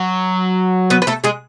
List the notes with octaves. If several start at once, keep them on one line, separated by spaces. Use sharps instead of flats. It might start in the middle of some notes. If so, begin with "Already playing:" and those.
Already playing: F#3
B3 B4
B4
A3 A4
G#3 G#4